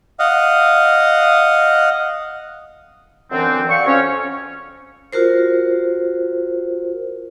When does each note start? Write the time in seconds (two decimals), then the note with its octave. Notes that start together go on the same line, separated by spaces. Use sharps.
0.19 D#5 F5 F#5
3.32 F#2 D3 E3 C4
3.69 F#4 D5 F5 C#6
3.86 F2 C#4 C#5
5.13 F4 F#4 A#4 C5